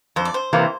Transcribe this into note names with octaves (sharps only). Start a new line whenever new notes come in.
F2 C5
D5
C5
C3 E3 A#3